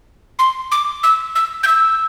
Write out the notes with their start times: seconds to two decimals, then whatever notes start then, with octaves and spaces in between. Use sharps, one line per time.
0.39 C6
0.72 D6
1.03 E6
1.35 E6
1.63 G6
1.67 E6